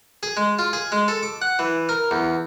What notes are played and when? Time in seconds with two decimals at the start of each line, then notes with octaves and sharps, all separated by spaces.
0.23 G#4
0.37 G#3
0.59 F4
0.73 G#4
0.92 G#3
1.08 A4
1.23 D6
1.42 F#5
1.59 E3
1.89 A#4
2.11 E2